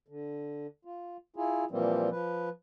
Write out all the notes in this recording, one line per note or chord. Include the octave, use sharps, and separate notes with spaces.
D3
F4
E4 F4 G#4
A#2 E3 F3 G3 A#3 C4
F3 B4